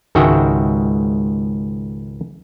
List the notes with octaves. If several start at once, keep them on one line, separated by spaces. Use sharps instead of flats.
C#2 G#2 D#3 F#4 E5 G5